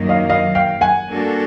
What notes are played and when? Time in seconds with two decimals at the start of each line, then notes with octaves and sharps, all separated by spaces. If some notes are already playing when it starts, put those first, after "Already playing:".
Already playing: F#2 D#3 F#3 A#3
0.09 D#5 F5
0.30 D#5 F5
0.55 F5 G5
0.81 F#5 G#5
1.08 G3 A#3 D4 F#4 A4